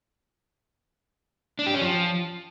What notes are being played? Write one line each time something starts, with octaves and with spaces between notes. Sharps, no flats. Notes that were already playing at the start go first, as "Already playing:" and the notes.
D4
G4
C#4
F3